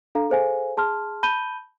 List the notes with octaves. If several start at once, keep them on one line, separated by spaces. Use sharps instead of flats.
D4 A4 F5 A#5
G#4 A4 C5 F5 G#5
G#4 A5 C6 F6
A5 B5 G6 D#7 G7